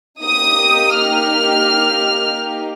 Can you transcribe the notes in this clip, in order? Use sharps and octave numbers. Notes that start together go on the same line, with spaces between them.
A#3 D#4 G4 D#6
F6